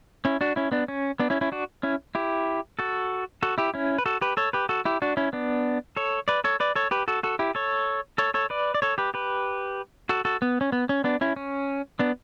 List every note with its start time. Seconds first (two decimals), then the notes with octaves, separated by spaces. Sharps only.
0.25 C#4 E4
0.41 D4 F#4
0.56 C#4 E4
0.72 B3 D4
0.88 C#4
1.20 B3 D4
1.30 C#4 E4
1.41 C#4 E4
1.52 D4 F#4
1.83 C#4 E4
2.15 E4 G4
2.79 F#4 A4
3.43 F#4 A4
3.58 E4 G4
3.74 C#4 E4
3.98 B4
4.06 F#4 A4
4.21 G4 B4
4.37 A4 C#5
4.53 G4 B4
4.69 F#4 A4
4.85 E4 G4
5.02 D4 F#4
5.17 C#4 E4
5.33 B3 D4
5.97 A4 C#5
6.28 B4 D5
6.44 A4 C#5
6.60 B4 D5
6.76 A4 C#5
6.91 G4 B4
7.08 F#4 A4
7.23 F#4 A4
7.39 E4 G4
7.55 A4 C#5
8.18 A4 C#5
8.34 A4 C#5
8.50 B4 D5
8.74 D5
8.82 A4 C#5
8.98 G4 B4
9.14 G4 B4
10.09 F#4 A4
10.25 F#4 A4
10.42 B3
10.61 C#4
10.72 B3
10.89 C#4
11.04 B3 D4
11.21 C#4 E4
11.36 C#4
11.99 B3 D4